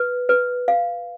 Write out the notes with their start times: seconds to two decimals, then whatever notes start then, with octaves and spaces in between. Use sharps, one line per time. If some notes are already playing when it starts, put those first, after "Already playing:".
Already playing: B4
0.29 B4
0.68 F5